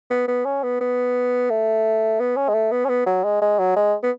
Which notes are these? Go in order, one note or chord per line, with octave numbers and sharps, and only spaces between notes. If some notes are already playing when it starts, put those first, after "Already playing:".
B3
B3
C#4
B3
B3
A3
B3
C#4
G#3
A3
B3
C#4
B3
F#3
G#3
G#3
F#3
G#3
B3